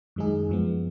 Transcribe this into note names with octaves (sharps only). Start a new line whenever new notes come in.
F#2 D#3 G#3 D#4 G#4
F#2 F3 G#3 B3